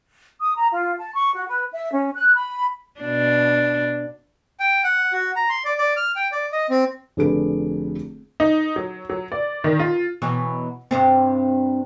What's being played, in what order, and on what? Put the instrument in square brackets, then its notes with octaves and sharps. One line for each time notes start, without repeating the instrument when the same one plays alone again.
[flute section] D#6
A#5
F4
A5
C#6
F#4
B4
E5
C#4
F#6
B5
[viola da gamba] B2 D4
[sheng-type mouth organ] G5
F#5
F#4
A#5
C6
D5
D5
F6
G5
D5
D#5
C4
[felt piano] F1 D3 D4 G#4 B4 D7
[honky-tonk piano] D#4
F#3
F#3
D5
D#3
F4
[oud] B2 E3 F#3
G2 C3 C4